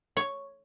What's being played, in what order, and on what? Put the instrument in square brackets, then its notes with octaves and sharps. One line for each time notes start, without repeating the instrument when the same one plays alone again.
[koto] C#5